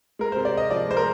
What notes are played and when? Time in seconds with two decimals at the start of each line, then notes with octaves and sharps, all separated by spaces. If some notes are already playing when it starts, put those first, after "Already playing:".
0.19 G#3 A#4
0.32 C3 C5
0.45 D5
0.54 C3 D#5
0.71 F3 D5
0.89 G#3 C5
0.97 A#4